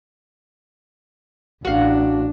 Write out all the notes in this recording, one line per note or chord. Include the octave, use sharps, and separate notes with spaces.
A1 D4 F#4 F5